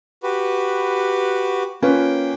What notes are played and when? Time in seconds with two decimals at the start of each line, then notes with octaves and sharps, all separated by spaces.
0.23 F#4 G4 B4
1.82 A#3 C#4 F4 B4 G5